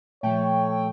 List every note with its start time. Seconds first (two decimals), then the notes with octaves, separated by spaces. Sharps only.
0.23 A#2 F3 A3 C#5 G5